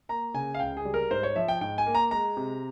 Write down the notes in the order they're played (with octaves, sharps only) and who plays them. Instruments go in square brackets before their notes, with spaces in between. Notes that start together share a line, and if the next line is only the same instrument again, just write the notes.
[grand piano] A#3 A#5
C#3 G#5
F5
C#2 G5
G#4
G3
A#4
G#2 C5
C#5
F3 E5
G5
G#2 G5
G#5
A#3
A#5
G#3 A#5
C3